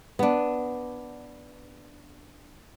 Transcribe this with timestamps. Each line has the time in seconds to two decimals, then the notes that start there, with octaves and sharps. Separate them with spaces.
0.19 B3 D4